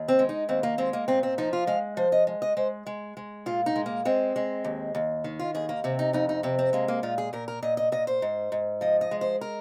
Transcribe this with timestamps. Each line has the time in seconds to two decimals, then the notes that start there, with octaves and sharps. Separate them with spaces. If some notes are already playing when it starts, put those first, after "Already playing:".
Already playing: D#2
0.08 C4
0.19 G#3
0.29 D#4
0.49 D#2 C4
0.63 A#3
0.78 G#3 C4
0.93 A#3
1.08 A#2 C4
1.23 C4
1.38 F3 D#4
1.53 F4
1.67 G#3 F5
1.97 F3 C5
2.12 D#5
2.27 G#3
2.42 D#5
2.57 G#3 C5
2.86 G#3
3.17 G#3
3.46 A#2 F4
3.66 D#4
3.76 G#3
3.86 A#3
4.05 G#3 C4
4.36 G#3
4.64 D#2
4.95 D#2
5.24 D#3
5.39 F4
5.55 D#2 G#4
5.69 A#3
5.84 C3 C4
5.99 D#4
6.13 F2 D#4
6.29 D#4
6.43 C3 C4
6.59 C4
6.73 G#3 A#3
6.88 A#3
7.03 A#2 F4
7.18 G#4
7.33 A#2 A#4
7.48 A#4
7.63 A#2 D#5
7.77 D#5
7.92 A#2 D#5
8.07 C5
8.22 G#2
8.52 G#2
8.81 F3 D#5
9.01 D#5
9.11 G#3
9.21 C5
9.41 A#4